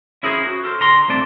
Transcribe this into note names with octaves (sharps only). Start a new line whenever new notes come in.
C#4 E4 G#4 A#4 C5
F#4
A4 A#4 C5
D3 A#5 C6
C2 A3 C4 D5 A5